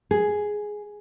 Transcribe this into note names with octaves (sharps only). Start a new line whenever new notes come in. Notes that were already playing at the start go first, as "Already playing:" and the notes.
G#4